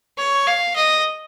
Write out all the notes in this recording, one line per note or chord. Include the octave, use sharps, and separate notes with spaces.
C#5
F5
D#5